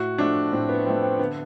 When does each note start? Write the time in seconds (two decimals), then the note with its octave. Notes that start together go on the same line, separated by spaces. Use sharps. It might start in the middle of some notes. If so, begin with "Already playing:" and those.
Already playing: A2 F#4
0.18 F3 A3 D4
0.52 A2 C4
0.69 B3
0.86 F3 A3 C4
1.02 C4
1.19 D3 B3